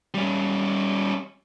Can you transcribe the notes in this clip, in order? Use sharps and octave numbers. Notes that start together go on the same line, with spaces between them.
G3 C#4